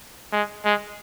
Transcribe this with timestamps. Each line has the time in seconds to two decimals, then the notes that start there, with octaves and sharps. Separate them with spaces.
0.32 G#3
0.65 G#3